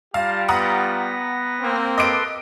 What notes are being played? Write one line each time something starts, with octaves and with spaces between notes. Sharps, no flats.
G3 F4 G4 F5 A5 A#5
B3 B4 F#5 A#5 D#6 A#6
A#3 C4
A4 B4 D#5 C6 D6 D7